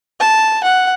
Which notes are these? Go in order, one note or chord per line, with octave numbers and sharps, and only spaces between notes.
A5
F#5